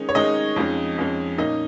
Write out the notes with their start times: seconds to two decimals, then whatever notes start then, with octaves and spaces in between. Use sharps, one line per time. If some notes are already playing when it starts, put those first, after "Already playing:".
Already playing: D#3 G#3 C#4 D#4
0.09 C#5
0.15 D#3 G#3 C#4 D#4 D#5
0.56 F2 F3 G#3 C#4
0.98 F2 F3 G#3 C#4
1.38 A#2 A#3 C#4 D#4 D#5